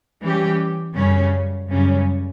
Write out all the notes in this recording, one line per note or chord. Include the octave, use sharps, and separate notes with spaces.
E3 G3 C#4 G4
F#2 C#3 G3 C#4
F#2 C#3 G3 C#4